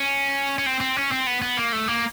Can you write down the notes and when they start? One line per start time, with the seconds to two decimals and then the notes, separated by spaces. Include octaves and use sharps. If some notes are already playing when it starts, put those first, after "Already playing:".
Already playing: C#4
0.58 C#4
0.66 C4
0.80 C4
0.96 C#4
1.11 C4
1.27 B3
1.42 B3
1.57 A#3
1.73 A3
1.88 A#3